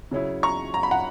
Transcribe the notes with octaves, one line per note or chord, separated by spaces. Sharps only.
C#3 F#3 C#4 E4
A#5 C#6
A#5
B5
F#5 A#5